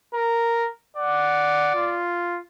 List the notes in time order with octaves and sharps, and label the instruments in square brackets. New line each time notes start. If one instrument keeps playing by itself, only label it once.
[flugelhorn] A#4
[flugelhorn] D5 [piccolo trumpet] F#5
[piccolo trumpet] F4